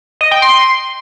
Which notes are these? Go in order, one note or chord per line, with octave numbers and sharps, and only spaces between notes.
D#5
G5
C6